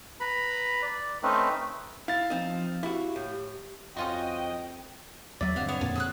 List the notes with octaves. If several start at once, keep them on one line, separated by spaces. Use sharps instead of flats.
B4 A#5 B5
D5
A3 C4 C#4 D#4 B4
E4 F5 A6
F3 C4 D#4
E4 F#4 G4
A2
F2 C#4 F4 F#4 D#5 G5
D#2 F#3 C#5 D5 E5
G2 D3 C4 F#4 F5
B3 C#5 F5 F#5
F2 A#2 A#3 A5
F3 G#4 E6 F#6